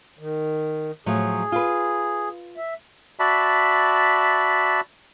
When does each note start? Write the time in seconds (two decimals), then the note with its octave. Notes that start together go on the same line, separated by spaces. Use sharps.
0.19 D#3
1.06 A2 F3 F#3 G#4
1.52 F4 B4
2.57 E5
3.19 F#4 D5 E5 A5 B5